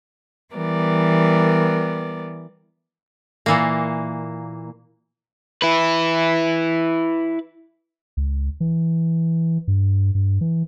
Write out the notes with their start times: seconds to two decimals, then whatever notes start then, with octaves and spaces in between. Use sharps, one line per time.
0.54 E3 G3 B3 A#4 D5
3.46 A#2 E3 A#3
5.62 E4 B4
8.17 C#2
8.60 E3
9.68 G2
10.15 G2
10.41 E3